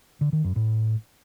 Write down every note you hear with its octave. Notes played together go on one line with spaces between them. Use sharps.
D3
D#3
F#2
A2